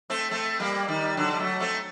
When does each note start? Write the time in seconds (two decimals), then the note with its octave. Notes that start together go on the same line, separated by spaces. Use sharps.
0.10 A3 C4
0.31 A3 C4
0.60 G3 A#3
0.88 D#3 G3
1.17 D3 F#3
1.31 G3
1.39 F#3 A3
1.60 A3 C4